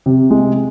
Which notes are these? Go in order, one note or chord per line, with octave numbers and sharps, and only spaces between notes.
C3
G#3